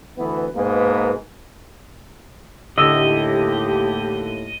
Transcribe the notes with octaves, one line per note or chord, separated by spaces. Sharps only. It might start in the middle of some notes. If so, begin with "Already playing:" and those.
D2 E3 B3
G#2 B2 A#3 A#4 B4
D#2 A2 D3 G4 D#5 E6